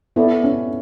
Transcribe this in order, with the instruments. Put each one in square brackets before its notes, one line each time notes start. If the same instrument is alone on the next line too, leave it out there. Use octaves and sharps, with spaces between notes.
[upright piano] B3 [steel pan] E4 A4 D5
[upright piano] C#4